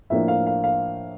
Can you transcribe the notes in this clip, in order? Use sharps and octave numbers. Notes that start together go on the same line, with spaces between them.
A2 F3 A#3 D4 E5
F5
F5
F5